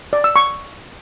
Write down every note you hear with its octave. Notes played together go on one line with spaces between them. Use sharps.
D5
E6
C#6